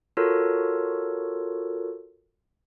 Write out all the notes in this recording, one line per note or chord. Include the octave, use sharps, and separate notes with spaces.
F4 F#4 A4 A#4 C#5